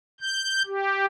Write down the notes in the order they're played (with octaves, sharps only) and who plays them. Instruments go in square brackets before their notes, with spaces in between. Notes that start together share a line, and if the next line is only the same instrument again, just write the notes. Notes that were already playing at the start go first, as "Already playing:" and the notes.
[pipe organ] G6
G4